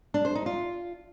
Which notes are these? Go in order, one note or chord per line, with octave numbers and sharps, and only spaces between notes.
D4
C5
D#4
F4